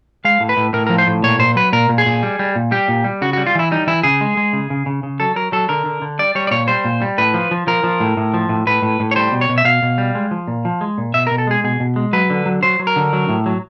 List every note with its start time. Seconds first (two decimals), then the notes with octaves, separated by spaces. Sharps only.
0.25 G#3 F5
0.40 A2
0.49 B4
0.57 A2
0.73 A2 A#4
0.87 F3 A#4
0.98 C5
1.07 A2
1.23 A#2 C#5
1.39 A#2 C5
1.56 F#3 B4
1.73 A#2 A#4
1.89 A#2
1.98 G#4
2.06 A#2
2.23 G3
2.39 G3
2.56 A#2
2.71 G3 G4
2.88 A#2
3.04 G3
3.22 C#3 F#4
3.33 F#4
3.37 G3
3.46 F4
3.55 E3 E4
3.71 G3 D#4
3.87 E3 E4
4.03 C#3 G#4
4.21 G#3
4.37 G#3
4.53 C#3
4.70 C#3
4.86 C#3
5.03 C#3
5.20 F#3 A4
5.36 F#3 A#4
5.52 F#3 A4
5.69 D3 A#4
5.85 D3
6.02 D3
6.19 G3 D5
6.35 G3 C#5
6.47 D5
6.51 A#2 C#5
6.68 G3 C5
6.85 A#2
7.02 G3
7.18 A2 B4
7.34 F3
7.51 F3
7.67 F3 A#4
7.84 F3
8.00 A2
8.17 A2
8.34 F3
8.49 A2
8.67 A2 B4
8.82 A2
9.00 A2
9.11 C#5
9.16 G3 C5
9.32 B2
9.41 C#5
9.49 B2
9.58 E5
9.65 B2 F5
9.83 B2
9.98 G3
10.15 G#3
10.31 F3
10.47 A#2
10.65 F3
10.81 G#3
10.98 A#2
11.14 B2 E5
11.27 A#4
11.31 B2
11.38 A4
11.47 G#3 G#4
11.64 B2 G#4
11.80 B2
11.96 G#3
12.13 F#3 B4
12.30 D3
12.46 F#3
12.63 F#3 C5
12.79 F#3
12.87 A#4
12.96 D3
13.13 F#3
13.29 A2
13.46 F#3